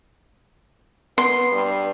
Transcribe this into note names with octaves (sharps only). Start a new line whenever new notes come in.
B3 C6
G2